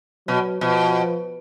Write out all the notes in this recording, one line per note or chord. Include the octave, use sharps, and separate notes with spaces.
B2 F#3
B2 F3